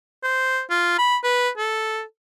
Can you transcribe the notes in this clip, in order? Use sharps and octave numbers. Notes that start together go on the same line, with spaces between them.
C5
F4
B5
B4
A4